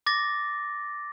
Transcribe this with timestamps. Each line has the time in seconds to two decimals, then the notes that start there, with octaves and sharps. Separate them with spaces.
0.06 D6 A6 A#6